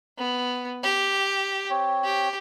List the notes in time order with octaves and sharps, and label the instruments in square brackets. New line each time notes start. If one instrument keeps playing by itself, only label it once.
[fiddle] B3
G4
[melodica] C4 C#5
[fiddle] G4